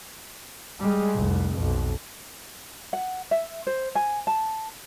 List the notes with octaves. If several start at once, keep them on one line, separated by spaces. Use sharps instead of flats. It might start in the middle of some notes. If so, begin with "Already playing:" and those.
G3 G#3
F1 C2
B1 F2
F#5
E5
C5
G#5
A5